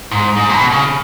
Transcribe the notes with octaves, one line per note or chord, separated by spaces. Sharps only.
G#2
G#2
C3
B2
C#3